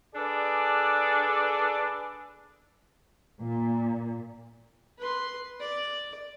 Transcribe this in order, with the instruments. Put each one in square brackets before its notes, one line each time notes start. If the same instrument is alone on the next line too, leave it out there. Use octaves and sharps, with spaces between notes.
[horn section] D4 G#4 A4 B4 D5
[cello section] A#2
[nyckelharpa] B4 C6
D5